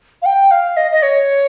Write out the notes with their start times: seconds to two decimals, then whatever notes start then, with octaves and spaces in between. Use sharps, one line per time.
0.22 F5
0.26 G5
0.51 F5
0.77 D#5
0.91 D#5
1.03 C#5